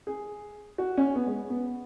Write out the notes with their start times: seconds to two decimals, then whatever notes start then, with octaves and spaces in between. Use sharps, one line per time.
0.07 G#4
0.78 F#4
0.97 C#4
1.15 B3
1.27 G#3
1.50 B3